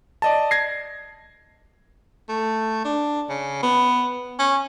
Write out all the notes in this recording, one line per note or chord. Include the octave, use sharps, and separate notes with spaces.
D5 D#5 A5
G#6 A#6 C7
A3
D4
C#3
B3
C#4